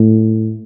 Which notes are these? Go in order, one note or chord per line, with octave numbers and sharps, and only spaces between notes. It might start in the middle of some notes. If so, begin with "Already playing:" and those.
Already playing: A2